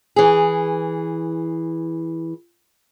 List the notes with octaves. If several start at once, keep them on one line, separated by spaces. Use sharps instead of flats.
E3 G#4